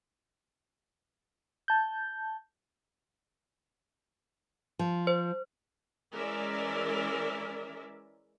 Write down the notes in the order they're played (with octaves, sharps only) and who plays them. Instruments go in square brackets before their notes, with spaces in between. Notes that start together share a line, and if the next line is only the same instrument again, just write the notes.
[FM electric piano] A5 G6
[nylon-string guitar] F3
[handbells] C5
[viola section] E3 G#3 C#4 A#4 D5 E5